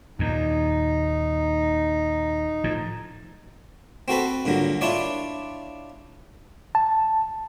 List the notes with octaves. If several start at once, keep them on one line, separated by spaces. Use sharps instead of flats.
D#2 A#2 D#4
A2 F3
C4 F#4 A4 B4
G2 A#2 D3 F#3
D4 E4 F4 C#5 D5
A5